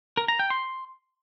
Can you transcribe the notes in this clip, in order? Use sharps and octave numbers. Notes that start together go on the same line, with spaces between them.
A#4
A#5
G5
C6